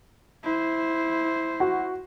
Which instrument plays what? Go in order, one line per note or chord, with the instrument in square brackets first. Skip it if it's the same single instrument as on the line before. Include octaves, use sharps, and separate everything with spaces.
[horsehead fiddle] E4 C5
[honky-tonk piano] F#4